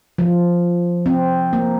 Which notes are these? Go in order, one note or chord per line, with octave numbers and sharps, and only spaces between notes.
F3
C4
A#3